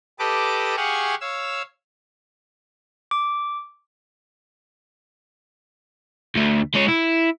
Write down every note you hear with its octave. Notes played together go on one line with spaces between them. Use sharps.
G4 A4 B4 D#5 A5 D6
G4 G#4 F5 F#5 G#5 C#6
C#5 F5 E6
D6
D2 A3
G#3 C#5
E4